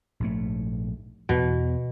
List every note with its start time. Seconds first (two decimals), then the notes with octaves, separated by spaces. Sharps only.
0.20 A#1 G#2 A3
1.29 E2 B2 B3